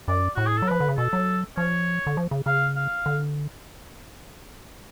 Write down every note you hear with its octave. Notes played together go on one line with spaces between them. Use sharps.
F#2 D5
A2 F#4
G#4
A4
F#3
F3 B4
D3
C#3
B2 A4
F#3
F3 C#5
D3
F3
C#3
C#3 F5
F5
D3